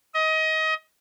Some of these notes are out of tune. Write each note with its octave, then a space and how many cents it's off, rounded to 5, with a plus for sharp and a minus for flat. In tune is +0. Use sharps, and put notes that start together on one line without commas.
D#5 +25